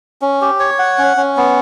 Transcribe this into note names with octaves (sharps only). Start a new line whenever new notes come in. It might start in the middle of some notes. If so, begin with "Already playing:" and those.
C#4
G4
C#5
F#5
C#4
C#4
B3